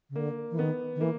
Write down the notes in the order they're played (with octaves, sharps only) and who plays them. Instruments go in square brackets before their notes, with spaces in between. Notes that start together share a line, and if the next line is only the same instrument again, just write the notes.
[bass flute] C#3
[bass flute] D3 [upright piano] A#3
[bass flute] E3
[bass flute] D#3 [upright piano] B3
[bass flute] D#3
[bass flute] E3 [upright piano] A#3